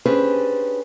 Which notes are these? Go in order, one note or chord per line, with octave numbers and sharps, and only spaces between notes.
C#4 D4 G4 G#4 B4 C5